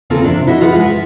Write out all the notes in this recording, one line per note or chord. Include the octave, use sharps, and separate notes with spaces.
E2 C#3 A#3 C4 F4 A4
C3 D4
E4 F#4 D#5 E5
F4 G#4 B4 F#5
G#3 F4
E5